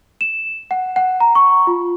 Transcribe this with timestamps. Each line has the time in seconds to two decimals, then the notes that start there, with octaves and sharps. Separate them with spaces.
0.21 E7
0.71 F#5
0.96 F#5
1.20 A#5
1.35 C#6
1.67 F4